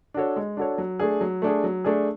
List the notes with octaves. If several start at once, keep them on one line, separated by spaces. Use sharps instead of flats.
D4 F#4 A4 C#5
G#3
D4 F#4 A4 C#5
F#3
A3 D4 G#4
F#3
A3 D4 G#4
F#3
A3 D4 G#4